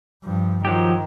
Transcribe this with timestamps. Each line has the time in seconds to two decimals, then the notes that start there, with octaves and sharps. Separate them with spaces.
0.24 G2 F3
0.65 D#3 F3 F#3 G4